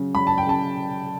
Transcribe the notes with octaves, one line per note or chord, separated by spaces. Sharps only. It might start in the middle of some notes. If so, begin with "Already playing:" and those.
Already playing: C#3 F#3
F#3 B5
A5
G5
C#3 A5